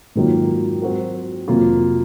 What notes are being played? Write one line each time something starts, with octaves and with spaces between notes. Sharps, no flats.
G#2 D#3 F#3 A#3 F4
F#3 C4 F#4 A#4
F2 C3 F#3 A#3 F4